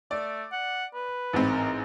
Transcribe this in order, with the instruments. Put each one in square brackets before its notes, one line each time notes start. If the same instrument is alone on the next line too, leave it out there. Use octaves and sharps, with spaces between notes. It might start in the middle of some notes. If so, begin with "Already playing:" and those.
[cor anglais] A3 [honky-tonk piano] D5
[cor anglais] F#5
B4
[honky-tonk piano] A1 G#2 C4
[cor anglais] A#4